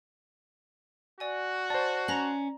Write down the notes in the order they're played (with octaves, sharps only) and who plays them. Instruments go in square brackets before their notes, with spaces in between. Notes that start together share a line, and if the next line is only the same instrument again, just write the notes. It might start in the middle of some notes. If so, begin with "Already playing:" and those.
[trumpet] F#4 [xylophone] D5 G#5
[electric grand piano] C5 A5 [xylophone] D5
[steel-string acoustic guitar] C#4 [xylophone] A#5 A#6 F#7